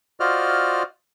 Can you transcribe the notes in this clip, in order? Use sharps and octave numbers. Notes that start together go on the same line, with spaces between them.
F4 F#4 C5 D5 D#5 F6